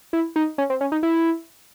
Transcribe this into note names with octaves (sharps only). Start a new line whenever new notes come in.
E4
D#4
C#4
C4
C#4
D#4
E4